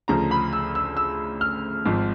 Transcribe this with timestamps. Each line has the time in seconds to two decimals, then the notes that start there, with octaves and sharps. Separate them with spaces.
0.08 D2 C#3 F3 A#5
0.31 B5
0.53 E6
0.75 E6
0.97 E6
1.41 F6
1.85 G#1 G#2 F3